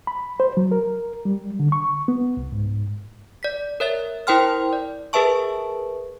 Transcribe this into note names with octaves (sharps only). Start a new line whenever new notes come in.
B5
C5
F#3
A#4
G3
D3
C#6
B3
C2
G#2
D5 B6
A#4 C#5 E5 A6
E4 A#4 C5 G5 C6 F6
D5
G#4 A#4 B4 E5 A5 C#6